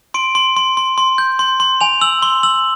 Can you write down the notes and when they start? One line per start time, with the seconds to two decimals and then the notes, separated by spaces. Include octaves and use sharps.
0.14 C6 D7
0.35 C6
0.56 C6
0.77 C6
0.98 C6
1.18 G6
1.39 C6
1.60 C6
1.81 G#5 F7
2.01 E6 F#7
2.22 C6 G7
2.43 E6 F#7